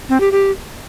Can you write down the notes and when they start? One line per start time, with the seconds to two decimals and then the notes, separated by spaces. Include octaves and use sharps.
0.09 C4
0.20 G4
0.32 G4